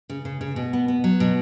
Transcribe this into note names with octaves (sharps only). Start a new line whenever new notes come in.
C#3
C#3
C#3
B2
B3
B3
F#3
B2